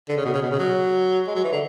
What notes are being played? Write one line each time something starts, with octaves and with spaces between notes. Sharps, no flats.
D3
C#3
B2
C#3
B2
C#3
F#3
G#3
F#3
E3
D3